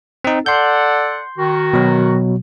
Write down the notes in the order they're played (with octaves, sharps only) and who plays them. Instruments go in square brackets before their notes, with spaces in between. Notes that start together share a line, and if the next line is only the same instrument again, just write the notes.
[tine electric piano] C4 D#4
[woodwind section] A4 D5 F#5 [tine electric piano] C6 G6
[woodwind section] D#3 F#4
[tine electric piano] B2 F#3